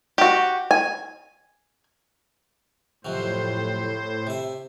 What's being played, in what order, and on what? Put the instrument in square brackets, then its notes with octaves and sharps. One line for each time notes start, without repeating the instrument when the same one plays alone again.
[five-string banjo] F#4 G4
G#5
[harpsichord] F2 C3 F#3 [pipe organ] A2 C5
[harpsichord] C3 E5